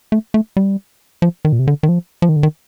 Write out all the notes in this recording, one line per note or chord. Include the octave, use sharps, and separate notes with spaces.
A3
A3
G3
F3
D#3
A#2
C3
D3
D#3
F3
F3
D#3
D3
D#3